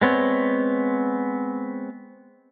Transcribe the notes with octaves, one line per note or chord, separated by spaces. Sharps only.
G#3 B3 C4 C#5